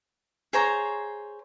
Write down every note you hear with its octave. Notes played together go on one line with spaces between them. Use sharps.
G#4 C5 C#5 A#5